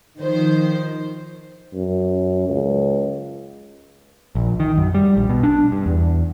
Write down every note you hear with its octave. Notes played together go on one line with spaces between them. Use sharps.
D#3 F3 C5
F#2
C#2
A#1
D#3
F#2
G3
A#1
B2
D4
G2
E2